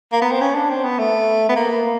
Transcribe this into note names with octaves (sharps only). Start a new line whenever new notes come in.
A#3
B3
C4
C#4
D4
C4
B3
A3
B3
A#3